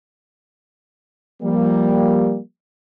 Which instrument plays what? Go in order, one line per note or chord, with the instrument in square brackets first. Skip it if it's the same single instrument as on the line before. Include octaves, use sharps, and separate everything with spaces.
[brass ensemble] F3 G3 A#3